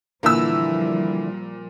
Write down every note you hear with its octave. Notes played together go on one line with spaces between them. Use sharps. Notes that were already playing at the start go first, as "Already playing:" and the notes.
A#2 D3 E3 F3 G3 E4 E6